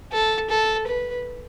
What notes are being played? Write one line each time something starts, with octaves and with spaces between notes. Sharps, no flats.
A4
A4
B4